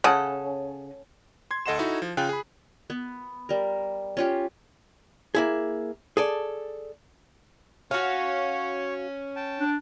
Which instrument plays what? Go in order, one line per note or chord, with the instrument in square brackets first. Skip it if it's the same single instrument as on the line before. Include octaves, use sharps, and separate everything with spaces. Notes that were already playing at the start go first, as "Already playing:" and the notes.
[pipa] C#3 [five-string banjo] C#4 A4 F#5
[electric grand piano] C6 G#6
D2 A4 D#5 F#5 C6 E7
D#4 E4 F#4 A4
F3
C#3 F4 G5 G#5 F#6
G#4 B5
[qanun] B3
G3 A#4
C#4 F4 G4
[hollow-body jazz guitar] A#3 E4 G#4
G#4 A4 D5
[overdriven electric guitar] C#4 [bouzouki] F#4 F5 [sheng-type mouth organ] C#5
[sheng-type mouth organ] G5 A5
[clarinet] D4